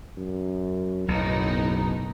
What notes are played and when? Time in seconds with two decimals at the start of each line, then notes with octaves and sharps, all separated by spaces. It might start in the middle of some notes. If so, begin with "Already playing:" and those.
0.18 F#2
1.08 F#1 B1 F#2 A2 B3 D#4